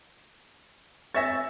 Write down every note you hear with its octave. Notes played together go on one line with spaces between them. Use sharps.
C#5 E5 G#5 A6 A#6